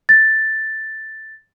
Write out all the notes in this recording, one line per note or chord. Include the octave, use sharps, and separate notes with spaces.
A6